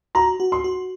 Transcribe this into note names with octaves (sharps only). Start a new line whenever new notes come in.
F#4 A#5
F#4
C6
F#4